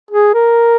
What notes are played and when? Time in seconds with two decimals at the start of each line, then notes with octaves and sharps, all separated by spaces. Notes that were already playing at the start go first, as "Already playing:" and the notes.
0.11 G#4
0.34 A#4